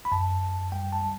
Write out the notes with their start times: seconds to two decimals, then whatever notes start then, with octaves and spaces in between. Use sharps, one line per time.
0.05 B5
0.12 F#2 A5
0.42 F#2
0.72 G3 G5
0.93 A5
1.02 G3